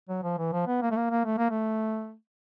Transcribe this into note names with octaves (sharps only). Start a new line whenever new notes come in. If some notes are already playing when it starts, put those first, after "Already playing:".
F#3
F3
E3
F3
B3
A#3
A3
A#3
A#3
A3
A#3
A3